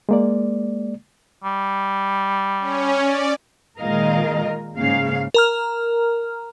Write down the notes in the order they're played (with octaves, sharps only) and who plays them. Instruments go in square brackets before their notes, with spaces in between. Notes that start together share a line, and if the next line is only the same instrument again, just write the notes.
[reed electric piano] G#3 A#3 D5
[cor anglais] G3
[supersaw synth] C#4
D5
[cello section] A#2 D#3 G#3 A#4 D#5 F5
G#2 C#3 A#3 F5
[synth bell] A#4 A#5 F6